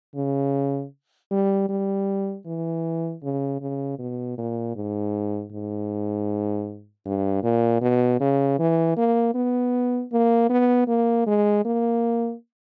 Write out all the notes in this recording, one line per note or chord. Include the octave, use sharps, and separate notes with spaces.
C#3
G3
G3
E3
C#3
C#3
B2
A#2
G#2
G#2
G2
A#2
B2
C#3
E3
A#3
B3
A#3
B3
A#3
G#3
A#3